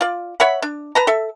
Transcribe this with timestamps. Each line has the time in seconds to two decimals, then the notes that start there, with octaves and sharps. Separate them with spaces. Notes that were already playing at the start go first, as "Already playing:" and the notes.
0.01 F4 D5
0.40 C#5 E5 F#5 B5
0.62 D4
0.95 B4 A5 A#5
1.07 A4 E5